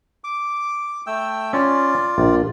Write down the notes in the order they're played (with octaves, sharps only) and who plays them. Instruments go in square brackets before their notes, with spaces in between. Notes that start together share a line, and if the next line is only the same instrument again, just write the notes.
[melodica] D6
A3 G5 E6
[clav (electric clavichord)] C#4 [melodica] F4 D5
[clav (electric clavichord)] A#1